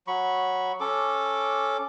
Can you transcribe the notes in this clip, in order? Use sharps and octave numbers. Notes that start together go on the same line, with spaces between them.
F#3 B5 C#6
C#4 A4 D6